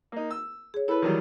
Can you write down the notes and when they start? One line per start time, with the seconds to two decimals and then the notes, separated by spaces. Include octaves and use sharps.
0.12 A#3 D#4
0.31 E6
0.74 G#4 C#5
0.88 E4 A4 B4 C#5 B5
1.02 D#3 E3 F#3 G3